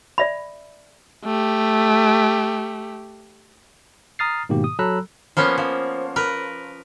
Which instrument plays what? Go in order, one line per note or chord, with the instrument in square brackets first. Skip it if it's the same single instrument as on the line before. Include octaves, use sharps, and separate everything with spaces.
[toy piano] D5 E5 B5
[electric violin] A3 G4
[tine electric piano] A#5 D#6 F6 A6 C7
G#2 B2 D#3 A#3 G4
D#6
F#3 A4 A#5 B5 E6 F#6
[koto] F3 A#3 B3 C#4
F3
A#4 B4